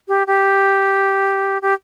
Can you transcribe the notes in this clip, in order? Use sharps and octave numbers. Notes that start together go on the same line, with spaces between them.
G4
G4
G4